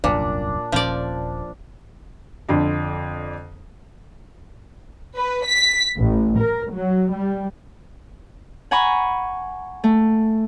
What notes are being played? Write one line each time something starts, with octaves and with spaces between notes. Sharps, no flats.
E1 C2 F#2 A#2 D4
D#1 A#2 F3 C#4 D5
F2 D3 D4
B4
B6
A1
A#4
F#3
G3
F#5 G#5 A#5 B5 C#6
A3